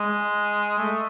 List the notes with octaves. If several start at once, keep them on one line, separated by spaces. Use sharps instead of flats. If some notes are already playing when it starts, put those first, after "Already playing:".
Already playing: G#3
A3